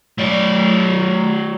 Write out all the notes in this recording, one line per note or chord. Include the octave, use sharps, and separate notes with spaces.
F#3 D5